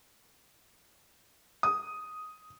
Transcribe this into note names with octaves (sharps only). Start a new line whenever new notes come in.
D#6